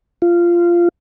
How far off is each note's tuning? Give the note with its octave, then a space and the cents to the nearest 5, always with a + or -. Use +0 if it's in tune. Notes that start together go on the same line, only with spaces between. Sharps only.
F4 -15